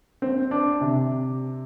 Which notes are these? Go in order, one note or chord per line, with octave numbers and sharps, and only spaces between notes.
C4
D4
C3